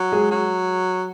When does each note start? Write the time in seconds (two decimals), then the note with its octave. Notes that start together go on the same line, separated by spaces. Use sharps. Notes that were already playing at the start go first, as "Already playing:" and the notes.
Already playing: F#3
0.12 G#3 G#4
0.31 F#3